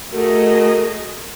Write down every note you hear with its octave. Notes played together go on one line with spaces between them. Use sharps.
A3 F#4 G#4 A#4 D#5